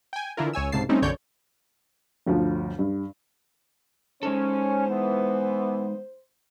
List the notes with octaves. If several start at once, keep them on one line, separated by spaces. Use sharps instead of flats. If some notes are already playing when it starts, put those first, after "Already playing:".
G5 G#5
D3 E3 E4 F4 A#4
C#2 C#5 G#5 E6
C2 G#2 C#3 A5 C7
G3 A3 C4 C#4 D#4
B1 F#2 D3 C#5 D5 G6
G1 D2 F3
G2
G#3 C#4 D#4 A4 C5
E3 B3